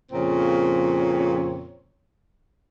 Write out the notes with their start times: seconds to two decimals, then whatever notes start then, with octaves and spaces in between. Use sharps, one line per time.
0.12 F2 A#2 C#3 C4 C#5